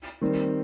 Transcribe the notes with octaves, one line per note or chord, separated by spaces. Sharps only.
D#3 G3 C4